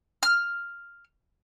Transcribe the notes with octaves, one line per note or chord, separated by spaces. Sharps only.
F6